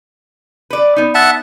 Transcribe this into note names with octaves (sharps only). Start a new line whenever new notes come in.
B4 D5
B3 D#4
E5 F#5 A5